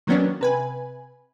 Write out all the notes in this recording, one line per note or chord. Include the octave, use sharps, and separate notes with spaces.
D#3 F#3 A#3 B3 C#4 D4
C3 B4 G#5